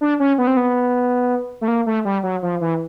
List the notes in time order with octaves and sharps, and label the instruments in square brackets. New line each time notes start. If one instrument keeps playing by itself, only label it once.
[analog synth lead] D4
C#4
B3
C4
B3
A3
A#3
A3
G3
F#3
F3
E3